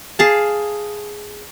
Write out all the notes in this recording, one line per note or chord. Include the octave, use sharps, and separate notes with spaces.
G#4 F5 A5